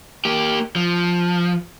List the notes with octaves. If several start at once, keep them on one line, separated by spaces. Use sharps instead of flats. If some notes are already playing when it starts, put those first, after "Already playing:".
A#3 G4
F3